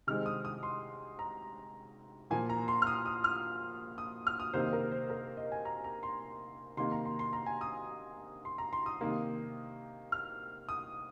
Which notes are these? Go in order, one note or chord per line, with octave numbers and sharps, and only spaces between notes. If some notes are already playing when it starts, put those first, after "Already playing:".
C3 D#3 G#3 C4 F6
D#6
D#6
C6
A#5
A#2 F3 A#3 G#5
A#5
C6
F6
D#6
D#6
F6
D#6
F6
D#6
C3 D#3 A#3 C5
C5
A#4
C5
A#4
D#5
G#5
A#5
A#5
C6
C3 D#3 A#3 C6
A#5
C6
C6
A#5
G#5
D#6
C6
A#5
C6
D#6
C3 D#3 A#3
F6
D#6